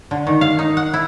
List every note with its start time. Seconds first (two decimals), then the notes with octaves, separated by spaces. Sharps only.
0.11 D3
0.27 D#3
0.41 F5
0.59 D#4
0.77 F#5
0.94 E4